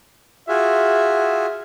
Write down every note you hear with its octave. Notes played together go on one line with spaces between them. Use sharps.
F4 F#4 G#4 E5